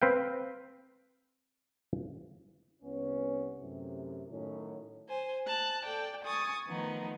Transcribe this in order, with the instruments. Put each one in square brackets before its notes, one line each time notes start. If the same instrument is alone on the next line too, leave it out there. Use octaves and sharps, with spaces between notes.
[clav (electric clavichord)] C4 B4 F5 G5
[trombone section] C2 B3 C#4
F#2 A2 C3
A2 D#3 F#3 C#4
[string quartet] C5 G#5
A5 F#6
A4 D5 G5
G#5 C#6 D#6 A6
D#3 F3 A3 B3 D#4